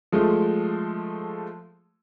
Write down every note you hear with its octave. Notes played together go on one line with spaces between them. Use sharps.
F3 G#3 A3